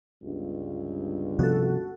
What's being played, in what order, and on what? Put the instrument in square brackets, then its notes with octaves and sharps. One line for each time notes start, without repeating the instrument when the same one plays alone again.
[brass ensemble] G1 C#2 G2
[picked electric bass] C3 F3 B3 [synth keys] F#4 A4